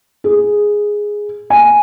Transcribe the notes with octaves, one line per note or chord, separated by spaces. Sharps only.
G#4
G#5